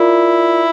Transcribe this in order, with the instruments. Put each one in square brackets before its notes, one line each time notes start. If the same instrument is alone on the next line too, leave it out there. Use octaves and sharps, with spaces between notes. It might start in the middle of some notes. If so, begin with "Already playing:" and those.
Already playing: [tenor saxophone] E4 [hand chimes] F4 A#4 D5